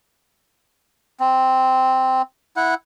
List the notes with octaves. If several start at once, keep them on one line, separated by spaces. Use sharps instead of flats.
C4
E4 F#5